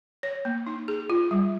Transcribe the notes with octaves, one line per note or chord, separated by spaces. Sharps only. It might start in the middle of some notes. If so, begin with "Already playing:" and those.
C#5
A#3
D#4
G#4
F4
G3